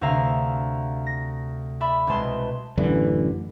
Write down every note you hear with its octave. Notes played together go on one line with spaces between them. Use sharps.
D2 C3 E5 F5 A#5
A#6
D5 E5 B5
C2 B2 G#3 A5 C6
A1 F#2 D3 E3